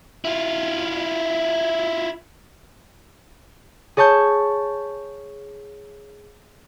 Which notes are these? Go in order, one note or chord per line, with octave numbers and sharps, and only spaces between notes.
E4 F4
G#4 C#5 A5 C#6 G6